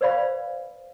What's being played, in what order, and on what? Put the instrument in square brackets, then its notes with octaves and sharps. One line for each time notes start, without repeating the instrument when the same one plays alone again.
[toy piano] B4 C5 D5 F5 B5